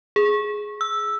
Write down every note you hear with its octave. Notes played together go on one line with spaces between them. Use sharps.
G#4
E6